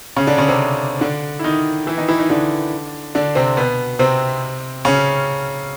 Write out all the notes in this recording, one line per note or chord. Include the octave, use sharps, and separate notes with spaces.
C#3 C#4
D3 D4
C#3 C#4
C3 C4
D3 D4
E4
D#3 D#4
E3 E4
D#3 D#4
E3 E4
D#3 D#4
D3 D4
D3 D4
C3 C4
B2 B3
C3 C4
C#3 C#4